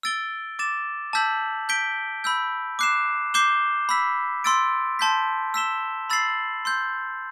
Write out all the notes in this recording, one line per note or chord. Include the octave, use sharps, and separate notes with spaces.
E6 A6 D7 G7
D6 A6 E7
A5 E6 G6 B6 F#7
G6 B6 D7 G7
B5 E6 G6
D6 F#6 C7 E7
D6 G6 C7 E7 G7
B5 E6 B6
C6 E6 A6 D7
A5 C6 G6 B6
E6 B6 E7 G7
B5 E6 A6 C7 F#7
C6 E6 G6